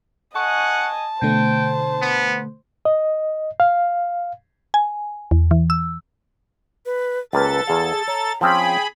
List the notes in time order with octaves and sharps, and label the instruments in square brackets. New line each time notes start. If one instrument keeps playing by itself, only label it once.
[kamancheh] D#5 G#5 [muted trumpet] F#5 [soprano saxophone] A5 [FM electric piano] C#6
[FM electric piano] B2 D3 A3 [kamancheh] C5 [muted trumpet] G5
[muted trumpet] B3
[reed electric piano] D#5
F5
[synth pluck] G#5
E2
E3
E6
[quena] B4
[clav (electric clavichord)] C#2 A#3 A5 [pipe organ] A4 A6 [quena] B4
[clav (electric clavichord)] E2 F5 [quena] G#4
[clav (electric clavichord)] C#5 [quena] A#5
[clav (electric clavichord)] F3 C4 C#4 [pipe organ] G#4 B5 [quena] G5